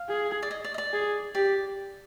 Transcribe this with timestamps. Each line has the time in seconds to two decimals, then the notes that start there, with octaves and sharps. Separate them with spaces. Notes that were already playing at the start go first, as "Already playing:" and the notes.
Already playing: F5
0.09 G#4
0.43 D5
0.51 D#5
0.64 D5
0.74 D#5
0.78 D5
0.93 G#4
1.35 G4 D5